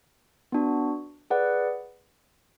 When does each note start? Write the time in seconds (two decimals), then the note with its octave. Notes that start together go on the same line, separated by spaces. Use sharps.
0.52 B3 D4 F#4
1.30 G#4 B4 D5 F#5